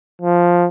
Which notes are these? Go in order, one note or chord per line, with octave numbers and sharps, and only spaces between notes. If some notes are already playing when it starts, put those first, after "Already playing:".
F3